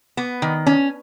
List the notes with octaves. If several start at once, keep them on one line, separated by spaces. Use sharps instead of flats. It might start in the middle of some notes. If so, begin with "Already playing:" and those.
B3
D#3
C#4